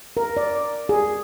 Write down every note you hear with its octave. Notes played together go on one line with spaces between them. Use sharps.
A#4
D5
G#4